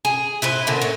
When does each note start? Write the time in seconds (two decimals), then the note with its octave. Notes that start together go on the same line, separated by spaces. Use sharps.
0.05 G#4
0.42 E4 B4 C5
0.67 A#2 D3
0.82 C#5